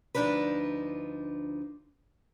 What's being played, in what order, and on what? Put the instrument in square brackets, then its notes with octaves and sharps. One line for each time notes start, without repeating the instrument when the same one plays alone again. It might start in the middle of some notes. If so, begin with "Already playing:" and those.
[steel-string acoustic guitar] D2 G#2 F3 D4 D#4 B4